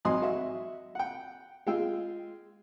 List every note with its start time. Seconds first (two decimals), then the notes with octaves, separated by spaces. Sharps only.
0.05 G#1 F#3 D#5 G#5 C6 D#6
0.22 F#4 D#5 E5
0.95 F#5 G5
1.67 G#3 F4 G5 E6